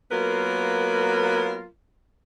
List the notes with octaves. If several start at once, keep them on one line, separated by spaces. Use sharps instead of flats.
F#3 A#3 B3 F4 A#4 B4